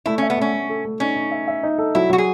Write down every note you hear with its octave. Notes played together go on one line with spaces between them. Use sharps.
A3 E4
C#4
E5
B3
A3 C#4
A3
A4
A3
C#4 D#4
D#4
E5
E5
D#4
A4
F#3 E4
F#3 F#4
G#4